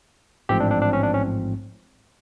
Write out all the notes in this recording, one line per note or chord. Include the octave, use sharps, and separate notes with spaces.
A1 G#2 F3 A3 C4 G4
D4
D4
D4
C#4
D4
C#4